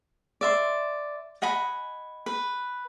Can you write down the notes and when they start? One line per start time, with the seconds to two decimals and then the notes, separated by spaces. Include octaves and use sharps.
0.41 D5 E5 C6
1.42 D#5 F#5 G#5 B5
2.26 B4